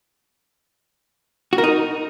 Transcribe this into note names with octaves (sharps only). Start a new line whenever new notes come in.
F#4
A#4
D#4